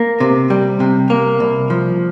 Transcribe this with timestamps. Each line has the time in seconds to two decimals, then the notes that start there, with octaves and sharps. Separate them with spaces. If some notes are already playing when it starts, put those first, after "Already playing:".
Already playing: A#3
0.20 C3
0.50 G3
0.80 C3
1.10 A#3
1.40 C2
1.70 F3